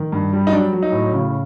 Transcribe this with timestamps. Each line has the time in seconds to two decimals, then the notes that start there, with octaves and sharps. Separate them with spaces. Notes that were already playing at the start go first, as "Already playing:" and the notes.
Already playing: D#3
0.12 G2
0.33 G3
0.47 D#4
0.52 F#3 D4
0.73 F#3
0.83 D#4
0.92 A2
1.13 C#3